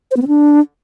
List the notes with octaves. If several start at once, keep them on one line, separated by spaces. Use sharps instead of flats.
C5
B3
C4
D4